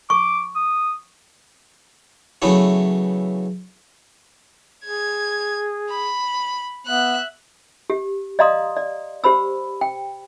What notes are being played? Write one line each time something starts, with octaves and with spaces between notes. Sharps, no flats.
C#6 D6
D#6
C#3 E3 F#3 A3 B3 E4
G#4 G#6
B5
B3 E5 F#6
G4
D5 D#5 F5 A#5 C6 D#6
D5
G4 C5 B5 E6
G5